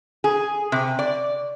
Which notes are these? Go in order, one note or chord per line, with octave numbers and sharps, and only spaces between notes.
G#4
C3
D5